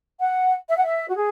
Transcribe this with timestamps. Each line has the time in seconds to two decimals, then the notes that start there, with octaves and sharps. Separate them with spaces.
0.19 F#5
0.68 E5
0.76 F#5
0.84 E5
1.08 F#4
1.15 G#4